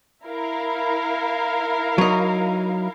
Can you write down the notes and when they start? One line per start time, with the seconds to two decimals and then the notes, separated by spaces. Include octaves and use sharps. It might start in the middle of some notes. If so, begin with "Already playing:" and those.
0.25 E4 A#4 F5
1.98 F#3 D#4